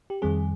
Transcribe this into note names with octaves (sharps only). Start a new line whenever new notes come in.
G4
F2 D#3 G3 C4 G#4